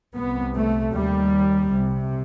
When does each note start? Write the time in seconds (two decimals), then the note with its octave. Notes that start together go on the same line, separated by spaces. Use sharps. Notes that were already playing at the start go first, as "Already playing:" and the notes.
0.16 C2 C3 B3
0.54 A3
0.93 D#2 G3
1.71 C2 C3